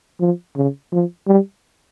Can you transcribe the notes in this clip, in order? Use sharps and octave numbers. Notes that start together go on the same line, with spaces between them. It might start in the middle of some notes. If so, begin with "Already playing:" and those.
F3
C#3
F3
G3